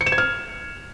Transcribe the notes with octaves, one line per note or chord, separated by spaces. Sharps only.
C#7
E7
G#6
F6